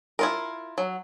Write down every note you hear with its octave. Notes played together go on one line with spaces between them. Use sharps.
E4 F4 A#4
F#3